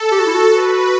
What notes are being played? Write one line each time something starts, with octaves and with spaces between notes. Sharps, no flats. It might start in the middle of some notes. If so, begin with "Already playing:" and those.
Already playing: A4
G4
F#4
E4
F#4
F#4 B4